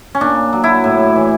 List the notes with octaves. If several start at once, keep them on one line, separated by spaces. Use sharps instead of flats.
C#4
A#2 D4
F#3
E4
A2
E3